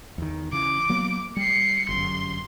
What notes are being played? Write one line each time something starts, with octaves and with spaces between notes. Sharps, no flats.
E2 D#3
C#3 E3 D6
F#3 A#3 B3
G3 C7 C#7
G1 F#2 C6